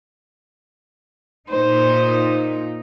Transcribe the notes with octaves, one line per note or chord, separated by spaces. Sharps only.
A#2 D#4 C5